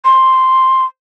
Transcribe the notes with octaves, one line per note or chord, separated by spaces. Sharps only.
C6